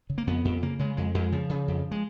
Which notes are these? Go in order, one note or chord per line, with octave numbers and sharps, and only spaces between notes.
C#3
A#3
F2 B3
F2
C#3 A#3
C#3 G#3
F2 G#3
F2 G#3
C#3 F3
C#3
F2
G#3